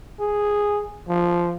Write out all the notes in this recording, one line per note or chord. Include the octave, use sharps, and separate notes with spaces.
G#4
F3